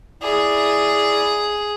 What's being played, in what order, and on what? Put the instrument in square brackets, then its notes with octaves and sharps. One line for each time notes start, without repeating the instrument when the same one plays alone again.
[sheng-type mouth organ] E4 D5 [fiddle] G#4